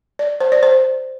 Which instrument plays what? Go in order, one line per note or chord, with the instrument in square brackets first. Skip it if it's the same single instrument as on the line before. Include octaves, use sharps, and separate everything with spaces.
[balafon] D5
C5
D5
C5